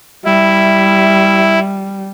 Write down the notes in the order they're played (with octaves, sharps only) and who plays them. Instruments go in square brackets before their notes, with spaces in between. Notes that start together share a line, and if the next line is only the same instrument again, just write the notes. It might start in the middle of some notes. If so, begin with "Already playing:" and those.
[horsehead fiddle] G3 [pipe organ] E4 [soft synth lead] E5